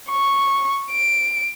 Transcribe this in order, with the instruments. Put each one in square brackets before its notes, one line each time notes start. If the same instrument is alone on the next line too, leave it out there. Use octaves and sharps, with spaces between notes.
[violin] C#6
D7